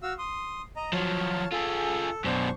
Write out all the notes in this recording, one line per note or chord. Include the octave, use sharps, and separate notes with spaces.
F#4 F5 E6
C6 D#6
D#5 A#5
F3 F#3 C#5 F5 A5
F4 G#4 A4
F#2 B2 D4 C5 C#6